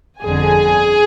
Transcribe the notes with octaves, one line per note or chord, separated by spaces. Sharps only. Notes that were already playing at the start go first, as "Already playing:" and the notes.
G1 F2 D3 G#4 G#5